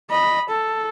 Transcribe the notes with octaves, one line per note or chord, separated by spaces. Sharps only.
D#5 B5
A4